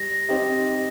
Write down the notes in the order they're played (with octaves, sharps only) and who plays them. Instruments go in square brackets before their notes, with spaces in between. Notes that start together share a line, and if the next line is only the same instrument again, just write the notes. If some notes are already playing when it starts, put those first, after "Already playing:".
Already playing: [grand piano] G3 [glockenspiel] A#6
[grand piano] C4 D#4 G4